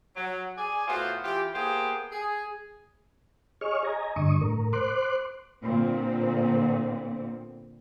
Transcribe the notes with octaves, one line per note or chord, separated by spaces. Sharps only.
F#3
G#4 D5 G#5
A2 B3 F4 F#4 C5
E3 F4 G4
A#3 B3 G4 G#4 C5
G#4
G#4 C#5 D#5 C#6 F6
D#5 G#5 A#5
G2 D3 C#6 D#6
A2 A#4
C5 C6 D6 F#6
A#2 D3 B3 C4